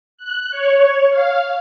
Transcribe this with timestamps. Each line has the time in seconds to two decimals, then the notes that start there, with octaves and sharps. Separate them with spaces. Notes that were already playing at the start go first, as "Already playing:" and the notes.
0.18 F#6
0.51 C#5
1.10 F5